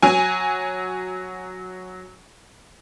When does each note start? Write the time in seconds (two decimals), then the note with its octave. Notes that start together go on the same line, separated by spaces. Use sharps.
0.02 F#3 G#5